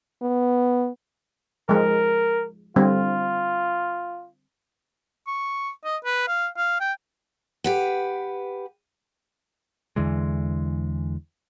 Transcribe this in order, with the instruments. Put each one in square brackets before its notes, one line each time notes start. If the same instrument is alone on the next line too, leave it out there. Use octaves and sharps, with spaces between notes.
[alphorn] B3
[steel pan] F3 G#3 [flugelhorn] A#4
[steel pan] D3 G3 C4 [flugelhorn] F4
[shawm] C#6
D#5
B4
F5
F5
G5
[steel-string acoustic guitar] G4 B4 F#5
[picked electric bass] E2 D3 E3 G#3